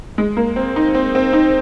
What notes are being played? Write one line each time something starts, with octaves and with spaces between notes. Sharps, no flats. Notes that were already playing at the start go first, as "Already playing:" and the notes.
G#3
A#3
C4
D#4
C4
C4
D#4